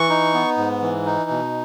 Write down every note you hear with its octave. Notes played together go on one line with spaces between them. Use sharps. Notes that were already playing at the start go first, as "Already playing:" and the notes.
Already playing: E3 C#6
D#4
B3
G#2
E3
D#4
B2